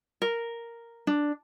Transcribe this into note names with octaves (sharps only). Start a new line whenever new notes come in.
A#4
D4